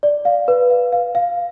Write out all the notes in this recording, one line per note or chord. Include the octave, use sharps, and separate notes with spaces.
D5
F5
B4
F5
F5
F5